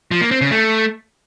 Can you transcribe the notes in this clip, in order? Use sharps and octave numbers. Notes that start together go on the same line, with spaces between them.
F3
A#3
C4
C#3
A3